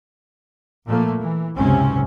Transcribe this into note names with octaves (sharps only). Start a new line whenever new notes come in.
A#2 F3 A3 A#3
E3
F#1 C#2 G#2 C3 C4 C#4